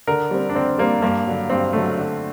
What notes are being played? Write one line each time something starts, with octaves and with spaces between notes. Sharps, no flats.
D3 A#4
G3 C4
D4
D3 C4
G3 A#3 C4
G2 A#3
D3 F#3
G2 C4
D3 F#3 A3
D3